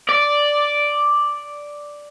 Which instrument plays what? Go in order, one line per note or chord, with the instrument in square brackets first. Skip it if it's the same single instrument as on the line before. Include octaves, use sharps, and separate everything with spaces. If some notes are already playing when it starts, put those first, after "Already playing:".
[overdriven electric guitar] D5